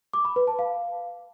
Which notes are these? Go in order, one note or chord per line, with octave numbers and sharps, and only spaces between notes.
D6
B5
B4
A5
F5